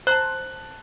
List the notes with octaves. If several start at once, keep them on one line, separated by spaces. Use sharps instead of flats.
C5 A5 A#5 C6 F#6